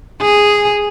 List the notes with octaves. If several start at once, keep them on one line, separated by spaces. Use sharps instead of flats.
G#4